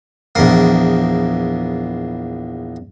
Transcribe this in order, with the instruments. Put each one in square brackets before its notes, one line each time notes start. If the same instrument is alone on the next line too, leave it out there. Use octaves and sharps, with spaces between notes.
[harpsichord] A#1 E2 A#3